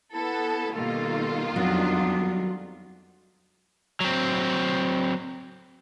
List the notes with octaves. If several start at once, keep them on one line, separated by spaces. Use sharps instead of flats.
B3 E4 A4
B2 D#3 G3 A#3 F4 A4
F2 F#3 G3 B3 D4
F#3 C4